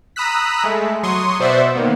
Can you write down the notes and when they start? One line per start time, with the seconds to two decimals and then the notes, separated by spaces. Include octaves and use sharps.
0.16 A#5 B5 D#6 E6 F#6 B6
0.64 G#3 A3
1.03 F#3 C6 C#6 D#6
1.39 B2 C5 D5 E5 F#5
1.75 D#3 A#3 B3